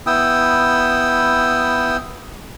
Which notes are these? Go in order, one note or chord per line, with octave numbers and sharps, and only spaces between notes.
B3 E4 G5 D#6 E6